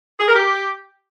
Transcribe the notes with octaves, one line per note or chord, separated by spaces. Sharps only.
G#4
A#4
G4